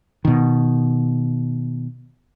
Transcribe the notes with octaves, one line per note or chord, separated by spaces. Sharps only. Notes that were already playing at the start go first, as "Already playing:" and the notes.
B2 D#3